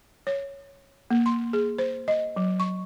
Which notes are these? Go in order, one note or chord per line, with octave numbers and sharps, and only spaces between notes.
C#5
A#3
C6
G#4
C5
D#5
F#3
C#6